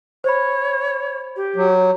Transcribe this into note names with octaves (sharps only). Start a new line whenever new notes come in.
C5 C#5 B5
G4
F#3